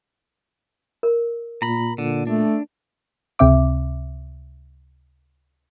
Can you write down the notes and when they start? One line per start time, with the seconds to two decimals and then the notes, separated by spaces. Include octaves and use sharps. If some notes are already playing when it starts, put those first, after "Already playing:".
1.03 A#4
1.62 A#2 A#5 B5
1.98 A#2 D3
2.27 A3 D4
3.39 C#2 C3 C4 E5 D6